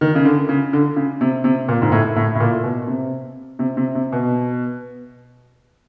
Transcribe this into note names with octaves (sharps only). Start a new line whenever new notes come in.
D#3
C#3
D3
C#3
D3
C#3
C3
C3
A#2
G#2
A2
A2
A2
A#2
B2
C3
C3
C3
C3
B2